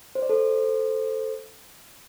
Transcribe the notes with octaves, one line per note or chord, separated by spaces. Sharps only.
C5
D5
A4 C5